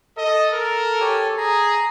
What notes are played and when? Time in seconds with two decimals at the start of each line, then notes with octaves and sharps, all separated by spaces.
0.18 A4 D#5
0.53 A#4
1.01 G4 C#5 G#5
1.37 G#4 A#5